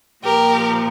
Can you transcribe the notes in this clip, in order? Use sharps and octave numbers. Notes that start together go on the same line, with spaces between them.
A#2 F3 G4 A#4